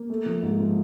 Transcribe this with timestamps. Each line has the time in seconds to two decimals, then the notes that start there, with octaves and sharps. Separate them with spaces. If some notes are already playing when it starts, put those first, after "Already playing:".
Already playing: A#3
0.10 A3
0.26 F3
0.42 G#2
0.60 F3